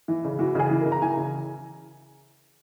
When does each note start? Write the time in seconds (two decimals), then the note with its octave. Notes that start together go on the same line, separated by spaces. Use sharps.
0.08 E3
0.25 C#3
0.39 E3 F#4
0.55 C#3 G#4
0.71 E3
0.81 A#4
0.85 C#3
0.92 A#5
1.02 E3 G#5
1.17 C#3